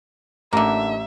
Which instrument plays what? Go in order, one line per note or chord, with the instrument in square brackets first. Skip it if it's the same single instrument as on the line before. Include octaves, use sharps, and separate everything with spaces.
[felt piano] A1 [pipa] D3 A#3 [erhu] E5 [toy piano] A#5